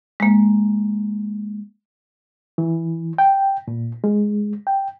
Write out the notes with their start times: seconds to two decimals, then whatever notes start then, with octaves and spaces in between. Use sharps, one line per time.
0.20 G#3 A#3
2.58 E3
3.18 G5
3.68 A#2
4.04 G#3
4.67 G5